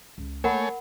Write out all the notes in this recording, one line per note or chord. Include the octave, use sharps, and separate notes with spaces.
C#2
A3 A#3 A#4 C#5 F#5 G#5 B5